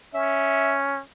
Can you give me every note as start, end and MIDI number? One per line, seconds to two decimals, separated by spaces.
0.14 1.01 61
0.14 0.76 76